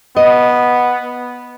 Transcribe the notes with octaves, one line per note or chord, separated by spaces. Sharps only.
B3 D#5